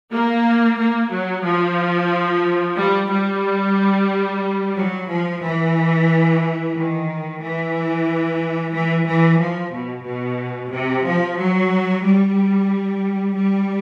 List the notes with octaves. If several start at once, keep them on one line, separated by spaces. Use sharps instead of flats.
A#3
A#3
F#3
F3
G3
G3
F#3
F3
E3
D#3
E3
E3
E3
F3
B2
B2
C3
F3
F#3
G3
G3